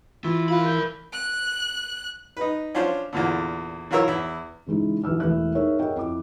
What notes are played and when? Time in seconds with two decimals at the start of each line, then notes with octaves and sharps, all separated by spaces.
0.24 E3 F4
0.49 F4 A#4 B5
0.66 G6
1.14 F#6
2.37 D#4 B4
2.75 C#4 D4 F4 C5
3.13 E2 A#2 D3
3.91 E3 F#3 F4 A#4 C#5 E6
4.07 E2 E4
4.66 C#3 E3 G#3 D#4 E4
5.04 A#1 E3 E4 E6 F6
5.20 E1 E3 A3 E4 F#6
5.55 D#4 G#4 A#4 C#5 E5
5.79 G#4 A#4 C#5 D#5 F#5 G5
5.96 F2 E4 D6